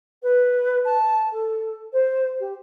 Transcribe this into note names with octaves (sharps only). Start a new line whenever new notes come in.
B4
A5
A4
C5
G4